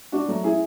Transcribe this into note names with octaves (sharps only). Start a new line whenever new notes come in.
D4 F#4
F#3 A3
E4 G#4